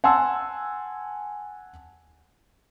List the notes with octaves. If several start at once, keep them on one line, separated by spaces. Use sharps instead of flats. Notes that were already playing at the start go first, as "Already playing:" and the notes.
F#5 G#5 A5 C6 E6